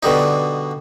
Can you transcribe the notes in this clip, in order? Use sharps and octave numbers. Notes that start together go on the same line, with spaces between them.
B2 D3 G3 D#4